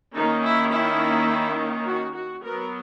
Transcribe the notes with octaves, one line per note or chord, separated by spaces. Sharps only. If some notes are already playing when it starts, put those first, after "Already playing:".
D#3 A#3 C#4 D#4
E4
E4
F#4
F#4
F#3 B3 A#4